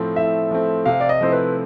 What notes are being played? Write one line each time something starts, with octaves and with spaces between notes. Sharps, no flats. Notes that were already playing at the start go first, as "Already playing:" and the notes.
Already playing: A2 F3 A3 C4
A2 E5
F3 A3 C4
C3 F5
D5
D#5
F3 A3 C4 E4 C5
B4